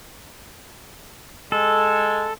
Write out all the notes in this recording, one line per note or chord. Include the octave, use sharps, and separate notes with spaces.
G#3 A4